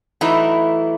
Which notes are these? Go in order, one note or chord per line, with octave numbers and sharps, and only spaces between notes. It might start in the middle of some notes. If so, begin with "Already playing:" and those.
E3 F#3 A3 D#4 E4